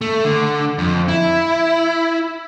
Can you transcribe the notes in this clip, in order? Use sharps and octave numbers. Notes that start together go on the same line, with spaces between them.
A3
D3
F2
E4